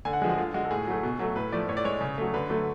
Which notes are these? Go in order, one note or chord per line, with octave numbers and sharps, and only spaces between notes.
D3 G#5
F#5
F3 G#3 G#4
F#4
D3 F4
G#3 F#4
A4
A2 G#4
F#3 A3
B2
F#3 A3
A2 B4
F3 A3 D5
A2 C#5
D5
G#3 C#5
C#3
F#3 A3
D3 B4
F#3 A3